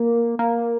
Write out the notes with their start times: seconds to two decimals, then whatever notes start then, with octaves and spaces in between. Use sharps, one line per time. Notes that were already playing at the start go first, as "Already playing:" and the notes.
Already playing: A#3
0.39 A#3